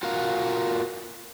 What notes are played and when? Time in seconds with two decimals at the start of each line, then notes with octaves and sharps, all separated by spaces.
0.03 F4 F#4 A#4 F5